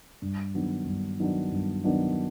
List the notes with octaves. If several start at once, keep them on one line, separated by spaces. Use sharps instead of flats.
G2
D#3 F#3 B3 D4
G2
D#3 F#3 B3 D4
G2
D#3 F#3 B3 D4